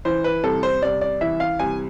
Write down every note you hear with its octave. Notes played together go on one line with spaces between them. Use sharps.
E3 C5
B4
C2 A4
C5
C2 D5
D5
E3 E5
F5
C2 G#5